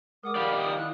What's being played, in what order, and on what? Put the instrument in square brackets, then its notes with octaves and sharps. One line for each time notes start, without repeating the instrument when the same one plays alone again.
[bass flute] G#3 [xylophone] A#4 F#5 D6 [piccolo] D#6
[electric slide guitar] D#3 G4 D5 [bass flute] F5 [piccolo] B5 [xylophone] F7
[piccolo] D#6
[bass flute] E4 [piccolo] F#6